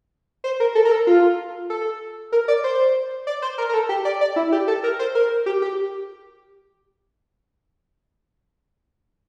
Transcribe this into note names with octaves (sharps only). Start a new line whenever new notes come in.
C5
A#4
A4
A#4
A4
F4
A4
A#4
D5
C5
D5
C5
A#4
A#4
A4
G4
D5
D5
E4
G4
A4
A#4
C5
A#4
G4
G4